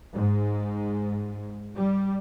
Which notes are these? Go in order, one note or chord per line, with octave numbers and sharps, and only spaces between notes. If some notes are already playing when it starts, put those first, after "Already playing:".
G#2
G3